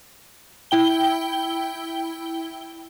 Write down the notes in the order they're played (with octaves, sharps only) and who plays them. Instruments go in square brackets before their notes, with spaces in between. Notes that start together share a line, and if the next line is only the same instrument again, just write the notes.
[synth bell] E4 G5 G7